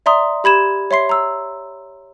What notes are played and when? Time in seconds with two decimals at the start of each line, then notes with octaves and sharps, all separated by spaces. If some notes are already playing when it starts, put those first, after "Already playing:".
0.06 D5 E5 A#5 C6 D#6
0.44 G4 B5 G#6 E7
0.91 C#5 E5 C6 C7
1.09 A#5 E6